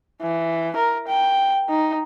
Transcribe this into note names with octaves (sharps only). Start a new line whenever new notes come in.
E3
A#4
G5
D#4